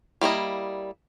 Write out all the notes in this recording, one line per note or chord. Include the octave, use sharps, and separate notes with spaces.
G3 A#3 E4 D#5